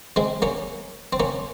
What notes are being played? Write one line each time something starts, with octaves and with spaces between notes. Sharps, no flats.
G#3 C4
A#3 C#4
C4
A#3 C#4